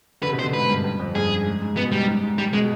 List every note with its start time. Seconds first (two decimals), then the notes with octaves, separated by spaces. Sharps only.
0.23 D3 B4
0.29 C3
0.33 B2
0.39 C5
0.44 D3
0.53 G#2 B4
0.69 G2
0.84 G2
1.00 F2
1.15 G2 G#4
1.46 G#2
1.62 G#2
1.77 B2 B3
1.92 G#2 G3
2.07 G#2
2.23 G#2
2.38 G#2 G3
2.53 B2 G#3